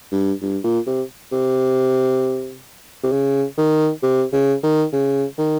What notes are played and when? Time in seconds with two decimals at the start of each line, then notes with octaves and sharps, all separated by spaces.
0.12 G2
0.42 G2
0.64 A#2
0.87 C3
1.32 C3
3.03 C3
3.12 C#3
3.58 D#3
4.03 C3
4.33 C#3
4.63 D#3
4.93 C#3
5.38 D#3